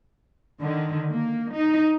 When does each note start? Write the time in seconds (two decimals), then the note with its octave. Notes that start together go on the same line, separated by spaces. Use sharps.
0.60 D3 D#3
1.10 A#3
1.54 D#4